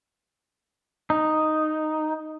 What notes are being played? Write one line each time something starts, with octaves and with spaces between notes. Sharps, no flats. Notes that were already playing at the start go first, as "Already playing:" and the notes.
D#4